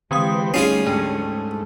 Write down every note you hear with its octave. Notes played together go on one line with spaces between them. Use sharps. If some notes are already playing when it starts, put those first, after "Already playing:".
D3 E3 G#3 C4 G4 B4 C5 D#6
D2 G3 C#4 D#4 F4 G#4 C#5 C7
G#2 A3 D4